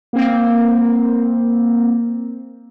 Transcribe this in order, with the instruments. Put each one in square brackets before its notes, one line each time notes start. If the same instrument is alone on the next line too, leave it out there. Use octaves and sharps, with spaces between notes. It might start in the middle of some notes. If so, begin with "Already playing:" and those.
[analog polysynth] A#3 C4